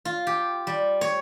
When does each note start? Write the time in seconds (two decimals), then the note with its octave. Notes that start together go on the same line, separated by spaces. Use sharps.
0.05 F4
0.27 G4
0.67 G3
1.01 C#5